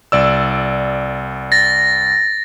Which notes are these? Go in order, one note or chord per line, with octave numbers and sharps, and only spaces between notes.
C2 D5 E6
A6 A#6